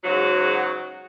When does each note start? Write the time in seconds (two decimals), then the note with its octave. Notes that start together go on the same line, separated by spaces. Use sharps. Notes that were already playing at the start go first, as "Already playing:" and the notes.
0.04 G#2 C#3 F#3 F#4